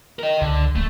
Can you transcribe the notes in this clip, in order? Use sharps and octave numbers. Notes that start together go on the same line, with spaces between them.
A#4 D#5
C#2 D3
D1 A3